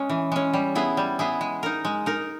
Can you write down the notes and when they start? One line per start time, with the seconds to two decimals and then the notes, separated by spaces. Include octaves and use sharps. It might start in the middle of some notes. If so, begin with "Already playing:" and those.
Already playing: G#3 C#4
0.10 E3
0.32 G#3 C#4
0.54 G3
0.75 B3 E4 G#4
0.97 G3
1.19 B3 E4 G#4
1.41 G#3
1.63 D#4 A#4
1.85 G#3
2.06 D#4 A#4